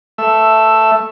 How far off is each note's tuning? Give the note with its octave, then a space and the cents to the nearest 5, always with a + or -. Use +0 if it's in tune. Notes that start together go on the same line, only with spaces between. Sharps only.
A3 +0 E5 +5